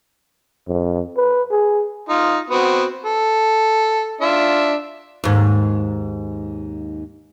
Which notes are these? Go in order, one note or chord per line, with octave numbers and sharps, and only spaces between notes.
F2
B4
G#4
D#4 F4
B3 C4 F#4
A4
D4 F4 E5
D#2 G#2